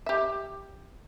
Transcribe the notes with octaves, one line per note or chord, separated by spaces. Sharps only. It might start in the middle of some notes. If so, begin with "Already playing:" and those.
G4 E5